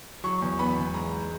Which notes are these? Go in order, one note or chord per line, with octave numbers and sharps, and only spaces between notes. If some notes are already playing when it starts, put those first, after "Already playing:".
F#3 C#6
E2
B3 B5
E2
G#2 A#5
G#2